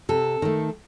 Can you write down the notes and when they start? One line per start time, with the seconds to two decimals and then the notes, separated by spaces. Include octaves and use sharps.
0.09 C3 A4
0.42 D#3 A3